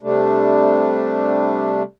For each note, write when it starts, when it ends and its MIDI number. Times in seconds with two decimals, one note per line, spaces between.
0.03 1.83 48
0.03 1.83 55
0.03 1.83 57
0.03 1.83 62